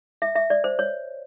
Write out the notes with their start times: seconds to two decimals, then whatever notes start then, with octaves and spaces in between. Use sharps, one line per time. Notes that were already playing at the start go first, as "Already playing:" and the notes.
0.22 E5
0.36 E5
0.50 D5
0.64 C5
0.79 C#5